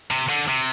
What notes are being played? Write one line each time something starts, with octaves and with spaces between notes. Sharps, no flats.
C3
D3
C3